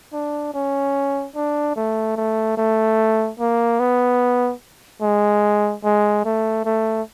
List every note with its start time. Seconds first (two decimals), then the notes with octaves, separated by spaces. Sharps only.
0.13 D4
0.54 C#4
1.35 D4
1.76 A3
2.17 A3
2.58 A3
3.40 A#3
3.80 B3
5.02 G#3
5.84 G#3
6.25 A3
6.65 A3